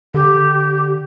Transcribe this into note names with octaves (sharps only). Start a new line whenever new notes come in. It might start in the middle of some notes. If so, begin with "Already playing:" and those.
D3 G4